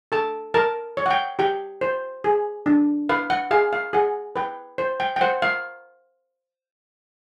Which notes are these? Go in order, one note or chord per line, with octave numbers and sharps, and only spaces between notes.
A4 A5
A#4 A5
C#5
F#5
G5
G4 G5
C5
G#4
D4
B4 F5
F#5
G#4 F5
F5
G#4 F#5
B4 G5
C5
G5
G5
C5 F#5
F5